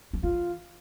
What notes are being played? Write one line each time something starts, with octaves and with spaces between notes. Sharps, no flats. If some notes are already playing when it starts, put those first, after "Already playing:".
F3
E3 F4